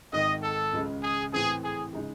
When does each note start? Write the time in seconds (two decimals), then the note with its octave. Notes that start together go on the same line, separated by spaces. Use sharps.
0.13 G#1 G#2 D#3 D#5
0.43 A4
0.73 C#2 C#3 G#3
1.03 G#4
1.33 A2 E3 C4 G#4
1.64 G#4
1.93 C#3 G#3 D#4 G#4